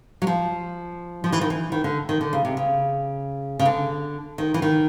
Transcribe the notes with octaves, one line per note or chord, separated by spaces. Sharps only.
F#3
F3
F3
E3
D#3
E3
D#3
D3
D#3
D3
C#3
C3
C#3
C#3
D3
D#3
E3
D#3